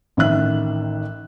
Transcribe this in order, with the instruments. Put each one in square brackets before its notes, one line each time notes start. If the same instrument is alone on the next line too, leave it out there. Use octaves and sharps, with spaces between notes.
[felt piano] A1 D#3 E5 F#6